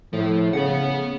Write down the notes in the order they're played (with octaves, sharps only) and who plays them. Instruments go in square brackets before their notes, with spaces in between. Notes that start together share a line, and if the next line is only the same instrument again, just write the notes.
[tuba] A2 [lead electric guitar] F3
[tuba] C#3 [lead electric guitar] B3 F#5